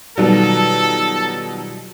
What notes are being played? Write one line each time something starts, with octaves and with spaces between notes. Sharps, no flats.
B2 D#3 F#3 G3 F4 A4